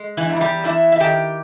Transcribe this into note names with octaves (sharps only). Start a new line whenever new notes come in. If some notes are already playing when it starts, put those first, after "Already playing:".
Already playing: G#3
E3 E4
E2
E4
G3 G4
E2 E4 E5
E5
D#3 G4 G5